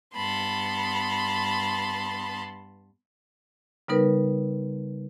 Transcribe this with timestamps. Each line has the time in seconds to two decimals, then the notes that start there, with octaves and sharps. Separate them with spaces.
0.15 G2 B3 A5 B5 C6
3.88 C#3 G3 B3 D#4 A#4 B4